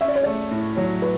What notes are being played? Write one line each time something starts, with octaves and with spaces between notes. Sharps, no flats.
C#4 E5
D5
C#5
A3 D5
A2
F#3 C#5
B4